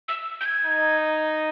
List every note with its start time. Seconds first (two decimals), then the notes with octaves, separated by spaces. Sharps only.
0.08 E6
0.41 G6
0.46 G#6
0.65 D#4